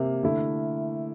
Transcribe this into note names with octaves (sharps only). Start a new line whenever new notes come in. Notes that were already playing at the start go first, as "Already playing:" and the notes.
Already playing: C3 A#3
D3 A3 E4